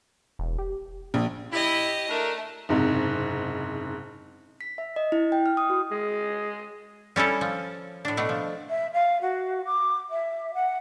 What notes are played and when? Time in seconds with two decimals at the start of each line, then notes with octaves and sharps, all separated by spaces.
0.39 E1
0.58 G4
1.14 A#1
1.52 E4 G4 D#5
2.09 A3 D4 A#4
2.69 F#1 G#2 C3
4.61 B6
4.78 E5
4.96 D#5
5.12 E4
5.32 G5
5.46 F6
5.57 D#6
5.70 F#4
5.91 G#3
7.16 G3 C#4 E4 A4
7.41 F3
8.05 A2 D4
8.17 B2 A3 D4
8.29 F3
8.69 E5
8.93 F5
9.21 F#4
9.65 D6
10.09 E5
10.54 F#5